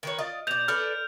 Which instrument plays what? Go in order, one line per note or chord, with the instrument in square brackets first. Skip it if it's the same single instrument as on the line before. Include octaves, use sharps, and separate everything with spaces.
[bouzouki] D#3 B4 C#5
F4 D5 D#5
[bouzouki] B2 D5 [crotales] G6 F7
[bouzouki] A4 B4 D5 [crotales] F6